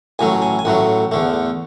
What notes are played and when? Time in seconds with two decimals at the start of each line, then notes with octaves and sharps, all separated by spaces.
0.19 A1 A2 F#3 A3 G#5
0.42 G#5
0.59 G#5
0.65 A1 A2 F#3 A3 F#5
1.12 E2 D3 A3